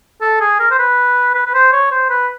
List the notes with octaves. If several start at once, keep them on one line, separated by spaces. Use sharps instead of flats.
A4
G#4
A#4
C5
B4
B4
B4
C5
C#5
C5
B4